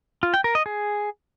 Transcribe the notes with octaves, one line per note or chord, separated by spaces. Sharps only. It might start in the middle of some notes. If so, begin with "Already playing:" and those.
F4
G5
A#4
D#5
G#4